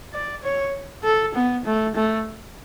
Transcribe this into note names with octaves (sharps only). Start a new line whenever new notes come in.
D5
C#5
A4
B3
A3
A3